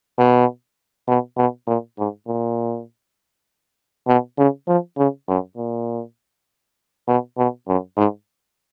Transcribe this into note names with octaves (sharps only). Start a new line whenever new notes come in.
B2
B2
B2
A#2
G#2
A#2
B2
C#3
F3
C#3
F#2
A#2
B2
B2
F#2
G#2